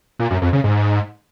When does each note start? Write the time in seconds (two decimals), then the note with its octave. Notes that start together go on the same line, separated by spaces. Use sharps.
0.19 A#2
0.31 F#2
0.42 F2
0.53 C#3
0.64 G#2